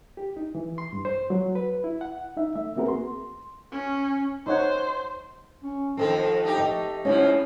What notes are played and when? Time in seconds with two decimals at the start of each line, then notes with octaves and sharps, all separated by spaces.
0.17 G4
0.37 D#4
0.55 E3
0.78 C6
0.93 G2
1.05 C5
1.30 F#3
1.55 B4
1.84 E4
2.01 F#5
2.37 D#4 E5
2.55 A3 E5
2.76 A#3 C4 F#4 G#4 A#4 B4
2.88 C6
3.72 C#4
4.47 D#4 C5 C#5 F#5
5.63 C#4
5.97 F2 D#3 F3 C4 A4 A5
6.43 A3 D#4 G4
6.57 D#5 G5
7.05 G#2 C#3 F3 C#4 E4 C#5